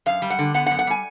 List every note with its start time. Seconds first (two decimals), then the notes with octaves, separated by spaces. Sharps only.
0.06 F#2 F5
0.22 G3
0.30 F#5
0.39 D3
0.54 B3 F#5
0.66 F#5
0.71 F#2
0.79 F#5
0.87 G3 G#5